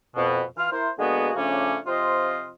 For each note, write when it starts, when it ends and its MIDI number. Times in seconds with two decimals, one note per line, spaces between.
0.16 0.42 41
0.16 0.42 47
0.57 0.68 52
0.57 0.68 65
0.57 0.68 89
0.72 0.89 64
0.72 0.89 70
0.72 0.89 72
0.98 1.30 50
0.98 1.30 56
0.98 1.30 58
0.98 1.30 59
0.98 1.30 66
0.98 1.30 68
1.35 1.77 49
1.35 1.77 53
1.35 1.77 57
1.35 1.77 61
1.35 1.77 62
1.87 2.49 48
1.87 2.49 53
1.87 2.49 60
1.87 2.49 65
1.87 2.49 72
1.87 2.49 75